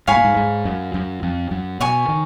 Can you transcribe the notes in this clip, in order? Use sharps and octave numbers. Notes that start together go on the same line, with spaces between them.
G#2 C#5 F5 G#5 B5
A#2
G#2
G#2
F#2
F#2
F2
F#2
B2 C#5 G#5 C#6
D#3